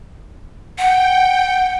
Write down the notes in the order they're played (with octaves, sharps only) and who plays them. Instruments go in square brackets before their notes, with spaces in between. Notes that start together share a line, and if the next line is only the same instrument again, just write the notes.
[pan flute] F#5 [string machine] G5